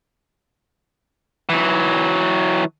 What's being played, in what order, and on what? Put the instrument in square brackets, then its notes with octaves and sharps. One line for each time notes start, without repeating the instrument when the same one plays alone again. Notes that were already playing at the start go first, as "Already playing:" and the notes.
[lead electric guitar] E3 F#3